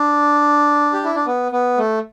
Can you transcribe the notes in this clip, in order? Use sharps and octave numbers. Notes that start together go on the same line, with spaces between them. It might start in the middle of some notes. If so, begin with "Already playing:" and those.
Already playing: D4
G4
E4
D4
B3
B3
A3